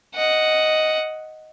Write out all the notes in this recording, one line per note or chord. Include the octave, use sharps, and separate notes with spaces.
D#5 F#5